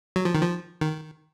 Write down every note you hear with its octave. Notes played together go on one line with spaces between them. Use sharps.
F#3
F3
D#3
F3
D#3